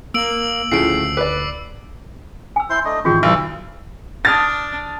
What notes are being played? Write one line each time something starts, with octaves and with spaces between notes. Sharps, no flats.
A#3 E6 D7 F#7
D2 A2 C#3 F3 C7 D7
B4 D5 D6
G#5 E6
E4 C5 C6
A3 D4 D#5
G#2 D#3 E3 C4 F4 F#4 G#4 C5
B1 A4 A#4
D4 D#6 F6 A6